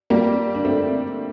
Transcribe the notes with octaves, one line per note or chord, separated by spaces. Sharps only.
G3 A#3
D4
A3 C4